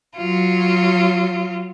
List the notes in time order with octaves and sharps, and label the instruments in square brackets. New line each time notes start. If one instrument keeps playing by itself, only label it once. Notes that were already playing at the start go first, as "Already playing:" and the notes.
[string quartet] F#3 F4